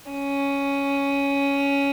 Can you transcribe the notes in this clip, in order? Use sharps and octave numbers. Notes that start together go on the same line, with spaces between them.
C#4